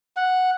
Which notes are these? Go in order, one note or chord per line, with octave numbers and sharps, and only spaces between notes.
F#5